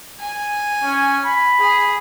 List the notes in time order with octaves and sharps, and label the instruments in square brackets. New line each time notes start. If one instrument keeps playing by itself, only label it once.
[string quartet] G#5
[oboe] C#4
B5
[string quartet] G#4